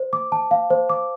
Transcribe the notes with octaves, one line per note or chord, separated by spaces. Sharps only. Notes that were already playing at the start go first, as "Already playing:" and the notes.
Already playing: C5
D6
A5
F5
C5
D6